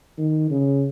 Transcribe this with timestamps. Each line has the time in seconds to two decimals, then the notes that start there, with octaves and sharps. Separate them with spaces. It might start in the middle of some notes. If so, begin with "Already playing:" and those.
0.18 D#3
0.50 C#3